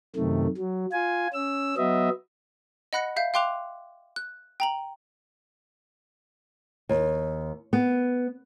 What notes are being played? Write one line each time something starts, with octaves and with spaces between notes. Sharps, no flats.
F#2 C3 D#3 A3
F#3
F4 G#5
C#4 E6
F#3 B3 D#5 E5
D#5 F#5 B5 F#6 A#6 C#7
E5 F5 G6
F5 G5 C6 D6 F#6 F7
F#6
G5 A#5 F#7
D#2
B3